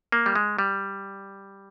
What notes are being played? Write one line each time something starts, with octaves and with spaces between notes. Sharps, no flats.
A#3
G3
G#3
G3